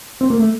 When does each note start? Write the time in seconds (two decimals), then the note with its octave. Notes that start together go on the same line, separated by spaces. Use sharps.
0.21 C4
0.30 A#3
0.39 A3